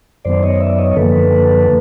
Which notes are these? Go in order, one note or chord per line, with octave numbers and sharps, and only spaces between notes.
F#2 D#3 F#3 B3 C5 D5
C#5 D#5
D5 E5
C#5 D#5
F#2 D3 F3 A#3 A4 B4